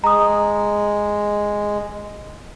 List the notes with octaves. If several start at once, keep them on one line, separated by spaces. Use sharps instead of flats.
G#3 A#5 D#6